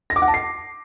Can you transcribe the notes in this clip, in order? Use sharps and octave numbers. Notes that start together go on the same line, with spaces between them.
A#6
D6
F#5
A5
C7